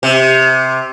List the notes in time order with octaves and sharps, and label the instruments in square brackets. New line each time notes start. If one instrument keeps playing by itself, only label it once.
[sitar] C3